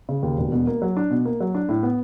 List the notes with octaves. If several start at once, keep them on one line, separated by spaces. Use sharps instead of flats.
C#3
D#2
E1
B2
A#3
F#3
D4
B2
A#3
F#3
D4
A2
B3